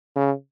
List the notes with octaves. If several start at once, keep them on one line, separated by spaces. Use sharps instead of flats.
C#3